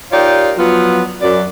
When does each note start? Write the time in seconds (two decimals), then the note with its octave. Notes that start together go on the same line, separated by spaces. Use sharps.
0.12 D#4 F4 G4 A#4 C#5 D5
0.58 F3 F#3 B3 F4
1.21 F#2 D5